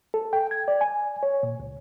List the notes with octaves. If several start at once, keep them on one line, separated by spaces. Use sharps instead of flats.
A4
G5
G#6
D5
G#5
C#5
A#2
C#2